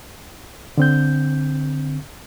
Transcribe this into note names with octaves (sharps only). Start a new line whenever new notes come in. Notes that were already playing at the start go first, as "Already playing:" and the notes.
D3 C4 G6